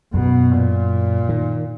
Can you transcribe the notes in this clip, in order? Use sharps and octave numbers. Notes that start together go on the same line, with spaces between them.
F#2 B2
A#2
D#3